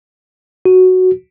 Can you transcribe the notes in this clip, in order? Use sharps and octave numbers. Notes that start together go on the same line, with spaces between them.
F#4